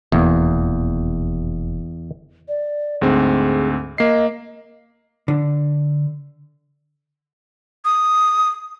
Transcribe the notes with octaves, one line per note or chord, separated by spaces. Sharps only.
F1 E2 B2 A#3
D5
D2 G#2 C4 G#4
A#3 D#5 C7
D3
D#6